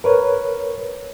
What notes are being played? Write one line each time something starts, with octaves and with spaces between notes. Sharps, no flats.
A#4 B4 C#5